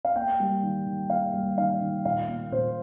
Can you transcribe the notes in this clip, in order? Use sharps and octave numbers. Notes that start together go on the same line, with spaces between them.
F5
A#3 G5
G3
D#3
D#3
A#3 F5
G3
D#3 F5
D#3
A#2 F5
A#3
A#2 C5